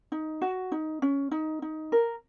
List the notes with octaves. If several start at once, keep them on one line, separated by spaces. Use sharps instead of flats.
D#4
F#4
D#4
C#4
D#4
D#4
A#4